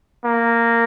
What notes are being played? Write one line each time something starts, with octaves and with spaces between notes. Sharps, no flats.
A#3